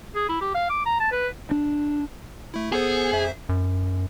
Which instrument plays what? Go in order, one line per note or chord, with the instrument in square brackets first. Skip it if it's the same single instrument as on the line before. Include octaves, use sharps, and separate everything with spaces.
[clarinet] G#4
E4
G4
F5
D6
A#5
A5
B4
[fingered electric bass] D4
[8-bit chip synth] A3 E4
[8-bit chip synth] B3 A4 C5 [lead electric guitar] G#4
[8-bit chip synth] F2 C5 E5
[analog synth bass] F#2